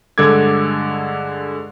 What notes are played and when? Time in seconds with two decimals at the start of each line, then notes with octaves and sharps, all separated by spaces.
0.18 G2 D3 G#3 A4 D6 G#6